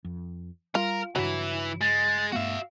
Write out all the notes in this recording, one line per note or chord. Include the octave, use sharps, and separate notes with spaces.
F2
G3 F4 A#4
G2 C#3 E3 F#3 E4
G#3 A6
G2 A3 B3 F#4 E5 F5